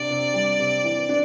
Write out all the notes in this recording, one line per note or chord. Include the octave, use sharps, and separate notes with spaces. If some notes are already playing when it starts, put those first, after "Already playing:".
Already playing: C3 D4 D5
C3
G3
C3
E3
D4